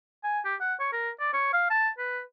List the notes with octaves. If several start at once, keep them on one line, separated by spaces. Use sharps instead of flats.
G#5
G4
F#5
C#5
A#4
D5
C#5
F5
A5
B4